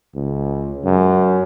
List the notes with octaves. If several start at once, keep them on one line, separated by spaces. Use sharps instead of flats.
C#2
F#2